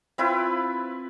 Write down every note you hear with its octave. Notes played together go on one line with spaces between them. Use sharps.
C4 E4 F4 B4